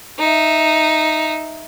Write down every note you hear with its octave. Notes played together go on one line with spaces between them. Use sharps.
D#4 E5